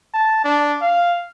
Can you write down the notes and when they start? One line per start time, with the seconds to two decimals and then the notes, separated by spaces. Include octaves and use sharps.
0.14 A5
0.44 D4
0.82 F5